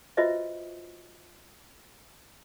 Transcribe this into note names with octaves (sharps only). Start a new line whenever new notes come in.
F4 F#4 B4 C5 D#5 E5